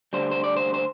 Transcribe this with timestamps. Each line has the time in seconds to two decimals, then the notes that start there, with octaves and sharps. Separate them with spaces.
0.13 D2 D3 G3 C5
0.31 C5
0.44 D5
0.57 C5
0.74 C5